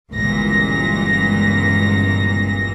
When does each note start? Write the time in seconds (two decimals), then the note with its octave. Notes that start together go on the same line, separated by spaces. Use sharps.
0.11 G1 C#2 A#2 E3 A#6